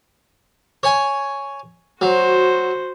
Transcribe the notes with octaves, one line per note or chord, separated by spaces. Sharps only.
C#5 G#5
F#3 F#4 C5